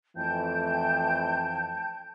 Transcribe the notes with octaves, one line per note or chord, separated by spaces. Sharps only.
F2 E3 A3 G5 A5 G6